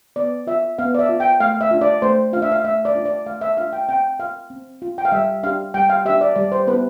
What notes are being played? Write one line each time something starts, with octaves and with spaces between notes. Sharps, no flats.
B3 D5
F4 E5
B3 F5
D5
E5
F4
G5
A3 F5
E5
D4 F4
D5
A3 C5
D4 F4 F5
E5
F5
A3 E5
D5
D4 F4
D5
A3 F5
E5
D4 F4 F5
G5
C4 G5
F4 F5
C4
F4
G5
F5
G3 E5
D4 G4 F5
G3 G5
F5
D4 G4 E5
D5
G3 D5
C5
B3 E4 G4 B4